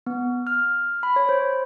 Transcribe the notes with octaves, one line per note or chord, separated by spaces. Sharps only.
B3
F6
B5
C#5
C5